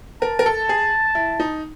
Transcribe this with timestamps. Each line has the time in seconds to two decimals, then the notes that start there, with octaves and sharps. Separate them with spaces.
0.22 A#4 A5
0.39 A#4
0.46 A4
0.69 G#4
1.15 E4
1.40 D#4